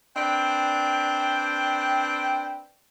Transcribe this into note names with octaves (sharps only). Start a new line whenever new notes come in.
C4 D4 B4 G5